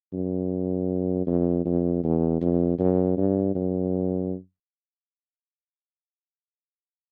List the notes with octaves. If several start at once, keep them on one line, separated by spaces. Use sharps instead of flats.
F#2
F2
F2
E2
F2
F#2
G2
F#2